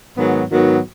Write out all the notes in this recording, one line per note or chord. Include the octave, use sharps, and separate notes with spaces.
G#2 D#3 F#3 B3 F#4
G#2 D#3 F#3 B3 F#4